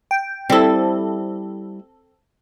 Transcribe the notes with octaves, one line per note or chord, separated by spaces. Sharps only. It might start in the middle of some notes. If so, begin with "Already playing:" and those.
G5
G3 C4 E4 A4